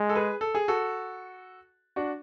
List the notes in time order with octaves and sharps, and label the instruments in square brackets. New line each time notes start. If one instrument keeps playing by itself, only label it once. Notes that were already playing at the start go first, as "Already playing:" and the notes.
Already playing: [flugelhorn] G#3
[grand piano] A4
G#4 B4
A4
G#4
F#4 A4
D4 F#4